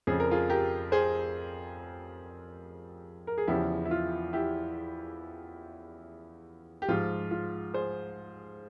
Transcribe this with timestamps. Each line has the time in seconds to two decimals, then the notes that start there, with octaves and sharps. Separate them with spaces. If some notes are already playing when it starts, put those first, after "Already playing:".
0.07 F2 C#3 F3 G#4
0.20 A#4
0.31 F4 G#4
0.50 G4 A#4
0.92 G#4 C5
3.27 A#4
3.38 G#4
3.48 E2 C#3 F3 E4 G4
3.85 E4
3.91 F4
4.33 E4 G4
6.82 G4
6.88 G#2 F3 F4
7.31 F4
7.74 G#4 C5